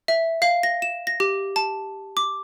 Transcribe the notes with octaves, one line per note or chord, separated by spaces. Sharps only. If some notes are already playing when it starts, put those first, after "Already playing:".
E5
F5
A#6
E7
A#6
G4
A5
D6